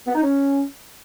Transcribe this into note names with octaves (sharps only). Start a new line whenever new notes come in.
B3
D#4
C#4